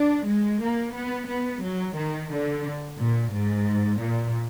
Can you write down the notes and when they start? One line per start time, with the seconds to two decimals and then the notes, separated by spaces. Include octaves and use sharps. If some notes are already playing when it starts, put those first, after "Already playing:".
Already playing: D4
0.27 G#3
0.61 A#3
0.94 B3
1.28 B3
1.63 F#3
1.97 D#3
2.31 D3
2.99 A#2
3.33 G#2
4.00 A#2